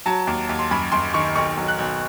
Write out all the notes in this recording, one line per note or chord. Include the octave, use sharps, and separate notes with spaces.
F#3 A5
D#2
D#2
C6
F#2 B5
F#2 C6
D#3 C#6
B1 C#6
F#3
F#6
B1